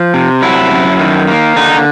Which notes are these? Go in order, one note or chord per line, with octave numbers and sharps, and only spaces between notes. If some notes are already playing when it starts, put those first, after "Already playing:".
Already playing: F3
C3
F#3 E4
F#2
D#3
A#3
D3 D#4